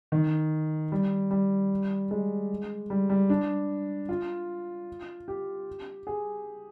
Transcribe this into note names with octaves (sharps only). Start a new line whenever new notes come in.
D#3
G3
G3
G#3
G3
G3
D4
F4
G4
G#4